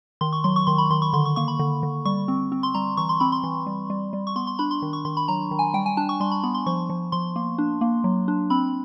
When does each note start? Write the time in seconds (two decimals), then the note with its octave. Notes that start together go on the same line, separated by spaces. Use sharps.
0.21 D#3 C6
0.33 C#6
0.44 F#3 C6
0.56 C#6
0.67 D#3 C6
0.78 B5
0.90 D#3 C6
1.02 C#6
1.13 D3 C6
1.25 C#6
1.36 A#3 C#6
1.48 B5
1.59 D3
1.83 D3
2.05 G3 C#6
2.28 C4
2.52 C4
2.63 C6
2.74 G3 A#5
2.97 E3 C#6
3.09 C6
3.20 C4 B5
3.32 C6
3.44 E3
3.66 G3
3.90 G3
4.13 G3
4.27 C#6
4.36 B3 C6
4.47 C6
4.59 D4 B5
4.71 C6
4.82 D#3
4.93 C#6
5.05 D#3 C6
5.17 B5
5.28 F#3 A#5
5.51 D#3
5.59 G#5
5.74 G3 G5
5.86 G#5
5.97 D4 A5
6.09 C#6
6.20 G3 C6
6.31 B5
6.44 B3 B5
6.55 C6
6.66 F3 C#6
6.90 F3
7.12 F3 C6
7.36 A#3
7.58 D4
7.81 A#3
8.04 F#3
8.28 D4
8.50 C4 B5